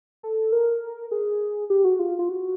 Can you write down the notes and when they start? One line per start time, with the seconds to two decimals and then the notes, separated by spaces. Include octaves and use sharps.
0.23 A4
0.52 A#4
1.11 G#4
1.70 G4
1.84 F#4
1.99 F4
2.19 F4
2.29 F#4